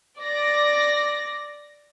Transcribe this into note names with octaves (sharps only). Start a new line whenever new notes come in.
D5 A#6